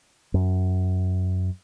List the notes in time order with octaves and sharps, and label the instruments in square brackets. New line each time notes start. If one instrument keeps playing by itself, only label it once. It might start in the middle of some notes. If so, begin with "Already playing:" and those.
[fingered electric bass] F#2